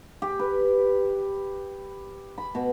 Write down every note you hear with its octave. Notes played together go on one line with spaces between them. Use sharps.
G4
B4
B5
B2